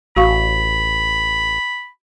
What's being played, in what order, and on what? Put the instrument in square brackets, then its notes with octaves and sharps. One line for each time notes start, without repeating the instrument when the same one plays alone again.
[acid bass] A1 [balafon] F#4 F5 C#6 [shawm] B5